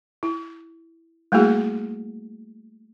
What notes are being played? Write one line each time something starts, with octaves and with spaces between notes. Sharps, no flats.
E4
G3 A3 A#3 E4 F#4 G#4